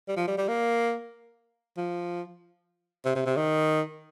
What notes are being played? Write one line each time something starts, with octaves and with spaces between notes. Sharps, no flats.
G3
F3
G3
G3
A#3
F3
C3
C3
C3
D#3